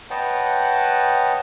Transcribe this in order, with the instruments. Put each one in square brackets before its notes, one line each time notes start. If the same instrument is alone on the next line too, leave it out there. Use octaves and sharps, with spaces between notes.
[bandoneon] B4 C#5 D#5 F#5 G5 A5